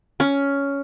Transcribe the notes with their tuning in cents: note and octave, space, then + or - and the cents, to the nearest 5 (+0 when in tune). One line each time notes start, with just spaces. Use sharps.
C#4 +10